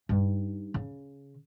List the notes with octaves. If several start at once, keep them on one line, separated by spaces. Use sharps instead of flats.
G2 D#4
C#3